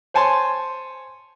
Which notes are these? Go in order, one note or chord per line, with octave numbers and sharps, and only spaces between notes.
C5 C#5 G#5 A5 C6